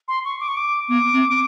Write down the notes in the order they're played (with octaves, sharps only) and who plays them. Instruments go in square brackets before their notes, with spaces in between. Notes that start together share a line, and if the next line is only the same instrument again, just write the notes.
[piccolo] C6
C#6
D6
C#6
D6
[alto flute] B3 [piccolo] D6
[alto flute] C4